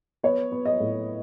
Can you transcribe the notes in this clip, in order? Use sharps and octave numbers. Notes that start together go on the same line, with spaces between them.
B3 C#5
B3
D#5
A2